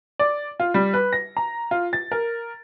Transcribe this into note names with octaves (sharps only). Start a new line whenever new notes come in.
D5
F4
G3
B4
A#6
A#5
F4
A6
A#4